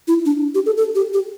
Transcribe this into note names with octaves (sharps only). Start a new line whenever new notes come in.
E4
D4
G4
A4
A4
G4
G4